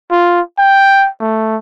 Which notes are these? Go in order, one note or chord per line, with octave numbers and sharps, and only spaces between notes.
F4
G5
A3